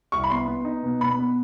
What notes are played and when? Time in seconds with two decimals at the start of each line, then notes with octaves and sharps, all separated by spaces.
0.12 C2 C#6
0.24 B5
0.30 B3 C6
0.47 B3
0.65 D#4
0.83 B2
1.01 B2 B5
1.19 B3